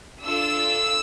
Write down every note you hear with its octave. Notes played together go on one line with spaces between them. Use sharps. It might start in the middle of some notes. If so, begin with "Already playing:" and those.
D4 F4 A4 E6